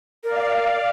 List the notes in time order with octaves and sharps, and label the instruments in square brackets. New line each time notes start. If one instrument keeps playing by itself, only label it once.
[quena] A#4 [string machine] D5 F5